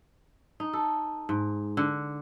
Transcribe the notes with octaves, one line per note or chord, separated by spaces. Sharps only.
D#4
A4
G#2
D3